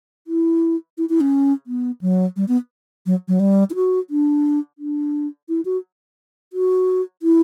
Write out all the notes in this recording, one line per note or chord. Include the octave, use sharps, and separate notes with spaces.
E4
E4
E4
C#4
B3
F#3
G3
B3
F#3
F#3
G3
E4
F#4
D4
D4
E4
F#4
F#4
E4